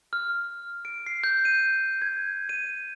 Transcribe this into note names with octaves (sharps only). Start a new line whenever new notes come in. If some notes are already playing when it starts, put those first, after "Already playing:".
F6
D7
C7
G6
D#7
G#6
D#7